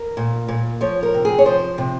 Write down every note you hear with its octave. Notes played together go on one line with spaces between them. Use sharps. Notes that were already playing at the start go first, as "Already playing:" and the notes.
Already playing: A#4
A#2
A#2
F3 C#5
A#4
C3
G#4
C#5
F3 C5
C3